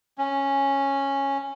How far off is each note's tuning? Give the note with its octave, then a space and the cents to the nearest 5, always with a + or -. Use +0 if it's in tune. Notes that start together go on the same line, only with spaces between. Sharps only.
C#4 -5